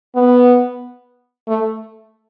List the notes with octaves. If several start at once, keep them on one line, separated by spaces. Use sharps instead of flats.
B3
A3